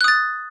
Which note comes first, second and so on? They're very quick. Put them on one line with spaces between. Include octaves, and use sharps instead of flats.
F#6 D#6 A6